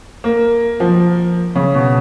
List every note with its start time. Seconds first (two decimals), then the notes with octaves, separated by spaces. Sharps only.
0.24 A#3
0.80 F3
1.56 C#3
1.75 B2